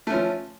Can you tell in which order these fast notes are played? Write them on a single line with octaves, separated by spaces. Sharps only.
A3 C#4 F3